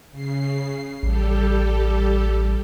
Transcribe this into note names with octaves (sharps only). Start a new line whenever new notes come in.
C#3 C7
A1 G3 G4 A4